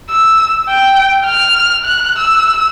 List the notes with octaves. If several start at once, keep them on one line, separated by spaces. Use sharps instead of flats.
E6
G5
F6
F#6
E6